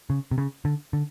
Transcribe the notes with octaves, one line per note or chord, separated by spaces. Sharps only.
C#3
C3
C#3
D3
D3